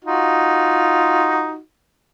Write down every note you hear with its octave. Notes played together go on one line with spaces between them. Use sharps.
D#4 F4 F#4